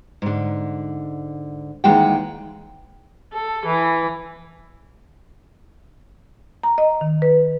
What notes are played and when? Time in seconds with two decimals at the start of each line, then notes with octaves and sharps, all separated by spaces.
0.22 G#2 D3
1.84 D#2 E3 G#3 D#4 F#5 G5
3.33 A4
3.66 E3
6.63 A#5
6.78 D#5
7.01 D#3
7.22 B4